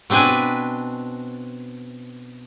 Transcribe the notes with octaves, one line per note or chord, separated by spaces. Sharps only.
B2 C4 D4 B4 G#5